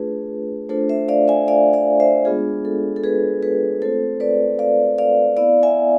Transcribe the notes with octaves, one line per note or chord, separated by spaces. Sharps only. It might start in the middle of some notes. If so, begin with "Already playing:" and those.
Already playing: A3 D4 F4 G#4 B4
A3 D4 F4 A4 C5
C5 E5
D5 F5
E5 G#5
D5 F5
D5 F5
C5 E5
G#3 B3 D4 F4 G#4
A4
A4
G#4 B4
G#4 B4
A3 C4 F4 A4 C5
B4 D5
D5 F5
D5 F5
B3 E4 D5 F5
E5 G#5